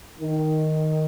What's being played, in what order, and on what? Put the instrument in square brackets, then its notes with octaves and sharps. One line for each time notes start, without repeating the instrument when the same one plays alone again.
[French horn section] D#3